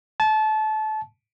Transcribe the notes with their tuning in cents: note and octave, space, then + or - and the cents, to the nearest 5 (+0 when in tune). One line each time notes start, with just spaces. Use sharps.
A5 -25